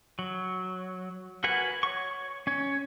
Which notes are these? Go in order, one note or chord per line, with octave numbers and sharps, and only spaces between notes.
F#3
F#4 A#4 B4 F#5 G#5
C#5 C#6
C#4 C#5